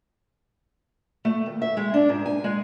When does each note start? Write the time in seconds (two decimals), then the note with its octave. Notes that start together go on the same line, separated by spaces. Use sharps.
1.25 A3
1.46 D#2
1.62 E5
1.77 G#3
1.94 D4
2.09 G#2
2.26 G#5
2.44 G#3